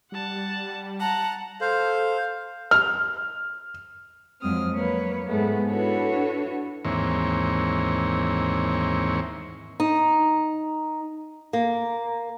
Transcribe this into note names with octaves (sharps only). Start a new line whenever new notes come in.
G3 F#5 A5
F#5 A5 A#5
A4 C5 F5
F6
F2 F#3 G#3 C4 D#6 F6
F#3 A#3 B4 C#5
G#2 G#3 A3 B3
D4 E4 F#4 A4 B4 C#5
D#2 G#2 E3 A#3 C4 C#5
D#4
A#3